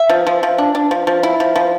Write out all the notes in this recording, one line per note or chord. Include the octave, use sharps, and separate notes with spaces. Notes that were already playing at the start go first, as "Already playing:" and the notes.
Already playing: E5
F3
F3
F3
D4
D4
F3
F3
E4
F3
F3